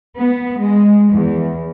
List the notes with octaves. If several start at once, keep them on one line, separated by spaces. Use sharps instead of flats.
B3
G#3
E2